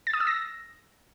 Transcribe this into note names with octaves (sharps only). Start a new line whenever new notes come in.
A6
D#6
E6
A#6